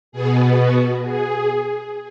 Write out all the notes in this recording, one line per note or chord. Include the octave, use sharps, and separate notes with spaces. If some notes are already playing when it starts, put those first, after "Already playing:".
B2 B3 G#4
F#4
G#4